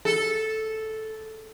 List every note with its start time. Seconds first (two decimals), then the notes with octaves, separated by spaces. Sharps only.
0.05 A4